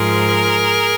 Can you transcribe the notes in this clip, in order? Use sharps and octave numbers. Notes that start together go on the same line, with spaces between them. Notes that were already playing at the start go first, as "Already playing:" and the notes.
Already playing: G#2 F3 G#4 A#4